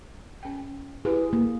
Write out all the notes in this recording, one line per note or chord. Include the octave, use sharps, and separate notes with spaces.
C#4 G5
E4 G4 G#4 B4
A#3